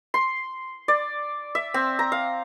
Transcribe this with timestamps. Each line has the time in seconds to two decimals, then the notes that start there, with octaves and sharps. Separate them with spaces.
0.14 C6
0.88 D5
1.55 E5
1.74 C4
1.99 A#5
2.12 F5